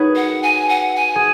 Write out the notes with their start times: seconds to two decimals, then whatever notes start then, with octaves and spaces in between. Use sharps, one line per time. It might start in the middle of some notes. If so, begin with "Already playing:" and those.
Already playing: D#4 F#4 G#4 B4 C#5
0.16 F#5
0.43 G#5
0.69 F#5
0.96 G#5
1.16 G#4